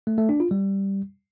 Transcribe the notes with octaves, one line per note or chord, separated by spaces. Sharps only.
A3
A3
D4
F4
G3